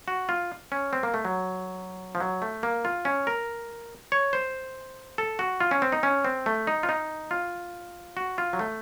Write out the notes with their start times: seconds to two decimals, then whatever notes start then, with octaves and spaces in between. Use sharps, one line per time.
0.08 F#4
0.29 F4
0.72 C#4
0.93 C4
1.03 A#3
1.14 A3
1.25 F#3
2.15 F3
2.20 F#3
2.42 A3
2.63 A#3
2.85 F4
3.05 C#4
3.27 A#4
4.12 C#5
4.33 C5
5.18 A4
5.39 F#4
5.61 F4
5.71 C#4
5.82 C4
5.92 D#4
6.03 C#4
6.25 C4
6.46 A3
6.67 D#4
6.83 F4
6.89 D#4
7.31 F4
8.17 F#4
8.38 F4
8.53 F#3
8.59 A3